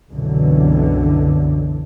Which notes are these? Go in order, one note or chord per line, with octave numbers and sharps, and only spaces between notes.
C2 F#2 B2 D3 E3 F#3